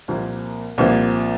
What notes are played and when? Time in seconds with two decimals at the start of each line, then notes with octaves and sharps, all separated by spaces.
0.08 C2 A#2 F3 A#3
0.78 C2 A#2 F3 A#3